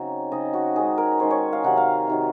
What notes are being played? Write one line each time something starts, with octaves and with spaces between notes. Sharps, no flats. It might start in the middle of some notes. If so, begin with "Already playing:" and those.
Already playing: C#3 F#3 C4 D#4
C#3 F#3 C4 D#4 D#5
F#4
D#3 G#3 C#4 G#4
A#4
D#3 G#3 C#4 C5
C#5
F5
C3 D#3 F#3 F#5
F5
C3 D#3 F#3